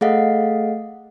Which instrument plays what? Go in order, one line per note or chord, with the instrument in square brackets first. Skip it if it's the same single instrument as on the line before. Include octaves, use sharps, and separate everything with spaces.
[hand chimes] A3 G#4 A4 D#5 F5 F#5